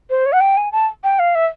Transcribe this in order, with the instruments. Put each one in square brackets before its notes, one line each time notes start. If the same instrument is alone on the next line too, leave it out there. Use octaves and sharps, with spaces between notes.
[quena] C5
C#5
F#5
G5
G#5
A5
G5
F5
E5